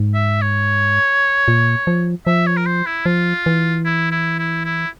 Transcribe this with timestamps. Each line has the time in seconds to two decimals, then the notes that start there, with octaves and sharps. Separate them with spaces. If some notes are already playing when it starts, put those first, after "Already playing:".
Already playing: G#2
0.14 E5
0.41 C#5
1.48 A#2
1.87 F3
2.26 F3 E5
2.47 C#5
2.57 A#4
2.66 C5
2.86 E4
3.06 F3 F4
3.46 E3
3.85 E4
4.11 E4
4.39 E4
4.65 E4